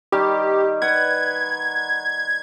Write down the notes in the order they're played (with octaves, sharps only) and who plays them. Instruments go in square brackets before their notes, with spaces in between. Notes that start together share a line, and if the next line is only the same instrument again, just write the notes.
[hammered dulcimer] D#3 G3 [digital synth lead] G4
[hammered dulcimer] B4 F#5 [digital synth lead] G#6